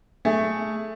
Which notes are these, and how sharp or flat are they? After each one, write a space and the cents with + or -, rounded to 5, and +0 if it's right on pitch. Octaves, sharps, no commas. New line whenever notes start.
A3 +0 G#4 +0